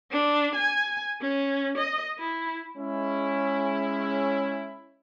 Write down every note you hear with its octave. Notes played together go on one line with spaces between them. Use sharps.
D4
G#5
C#4
D#5
E4
G#3 C#4 E4